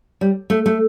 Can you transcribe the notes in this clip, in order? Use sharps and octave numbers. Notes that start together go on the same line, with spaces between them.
G3
A3
A3